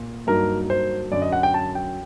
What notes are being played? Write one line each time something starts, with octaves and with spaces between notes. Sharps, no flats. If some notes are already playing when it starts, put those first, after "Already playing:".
Already playing: A#2
G2 F#3 A#3 D#4 A#4
C5
F#2 D3 F#3 D5
D#5
F#5
G5
A5
G5